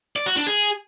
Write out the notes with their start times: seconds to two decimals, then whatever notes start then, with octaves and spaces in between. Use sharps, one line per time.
0.16 D5
0.26 F#4
0.36 D4
0.47 G#4